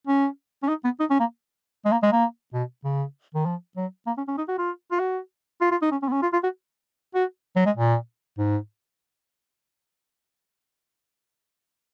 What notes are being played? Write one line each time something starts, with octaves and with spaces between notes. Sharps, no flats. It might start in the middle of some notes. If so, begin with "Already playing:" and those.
C#4
C#4
D#4
B3
D#4
C#4
A#3
G#3
A#3
G#3
A#3
B2
C#3
D#3
F3
F#3
A#3
C#4
C#4
D#4
F#4
F4
F4
F#4
F4
F4
D#4
C#4
C#4
B3
C#4
F4
F4
F#4
F#4
F#3
G#3
A#2
G#2